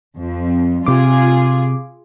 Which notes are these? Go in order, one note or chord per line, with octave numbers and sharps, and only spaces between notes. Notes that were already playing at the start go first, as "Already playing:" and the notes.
F2
C3 F4 G#4 D6